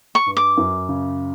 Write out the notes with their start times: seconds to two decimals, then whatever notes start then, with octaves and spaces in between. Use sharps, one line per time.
0.15 C#6
0.26 G2
0.37 D6
0.57 F#2
0.89 C#3